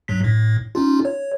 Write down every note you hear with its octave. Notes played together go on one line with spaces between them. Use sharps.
G2 F#3 B6
A2
C#4 D#4 F4
C#5